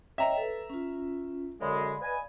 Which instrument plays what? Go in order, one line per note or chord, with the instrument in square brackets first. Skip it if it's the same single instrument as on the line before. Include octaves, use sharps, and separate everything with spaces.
[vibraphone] C#5 D#5 G5 [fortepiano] E5 A#5
[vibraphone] A4 B4
C#4 F4
[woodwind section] F#2 D3 G#3 [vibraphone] D5 F5 B5
[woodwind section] B4 D#5 G#5